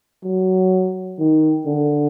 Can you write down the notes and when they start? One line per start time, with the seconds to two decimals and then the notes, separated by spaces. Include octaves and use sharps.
0.23 F#3
1.19 D#3
1.66 D3